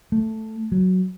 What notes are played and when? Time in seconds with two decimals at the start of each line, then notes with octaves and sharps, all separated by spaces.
0.12 A3
0.72 F#3